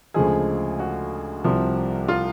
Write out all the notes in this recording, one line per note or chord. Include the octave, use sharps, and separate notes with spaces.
D2 C#3 F3 G#3 G#4
F#4
C2 C3 F3
F4